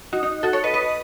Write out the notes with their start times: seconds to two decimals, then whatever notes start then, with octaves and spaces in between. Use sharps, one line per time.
0.13 D#4 F#4
0.23 D#4
0.43 F#4 A4
0.53 A4 C#5
0.64 B4 D#5
0.74 B4 D#5